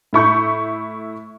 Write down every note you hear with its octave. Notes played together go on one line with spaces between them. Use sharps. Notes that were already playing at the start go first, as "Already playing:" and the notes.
A2 E4 C#6 G6